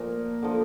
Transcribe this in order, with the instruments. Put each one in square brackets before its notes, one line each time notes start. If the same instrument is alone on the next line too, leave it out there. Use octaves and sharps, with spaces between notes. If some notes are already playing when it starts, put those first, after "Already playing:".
Already playing: [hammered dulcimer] A#2 F3 A#4
D3 F3